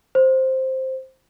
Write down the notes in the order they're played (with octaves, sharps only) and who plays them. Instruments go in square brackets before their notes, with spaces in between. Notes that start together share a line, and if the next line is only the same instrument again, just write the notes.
[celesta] C5